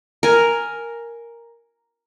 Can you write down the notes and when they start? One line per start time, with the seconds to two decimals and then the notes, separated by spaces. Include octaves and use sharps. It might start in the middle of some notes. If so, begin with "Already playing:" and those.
0.23 A#4 G#5